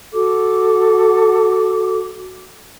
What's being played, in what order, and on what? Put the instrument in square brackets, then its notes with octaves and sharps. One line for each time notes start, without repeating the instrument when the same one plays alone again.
[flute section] F#4 A4 D6